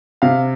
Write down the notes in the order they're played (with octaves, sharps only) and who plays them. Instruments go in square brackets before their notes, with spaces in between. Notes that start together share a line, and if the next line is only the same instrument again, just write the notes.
[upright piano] C3 F5